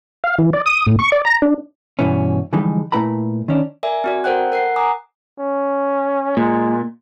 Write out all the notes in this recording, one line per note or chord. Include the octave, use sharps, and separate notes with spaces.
F5
E3
D5
D#6
A2
C#6
D5
A#5
D4
G2 B2 E3 B3 C#4
D3 E3 F3 G3 G#3 D#4
A#2 A3 E4 B4 A#5 B5
D#3 C#4 D4
A#4 D5 E5 G#5
C4 F#4 D5
A4 A#4 C5 F#5 G5 F#6
A#4 F#5 F#6 C7
G#5 A#5 D6 D#6
C#4
A#2 G#3